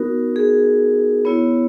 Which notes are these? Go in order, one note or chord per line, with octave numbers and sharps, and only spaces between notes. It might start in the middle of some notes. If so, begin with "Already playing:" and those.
Already playing: B3 D#4 F#4 A#4
G#4
B3 E4 C#5